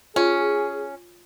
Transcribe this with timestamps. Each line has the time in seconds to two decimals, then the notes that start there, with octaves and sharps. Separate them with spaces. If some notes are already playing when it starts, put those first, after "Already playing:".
0.16 C#4 F4 G#4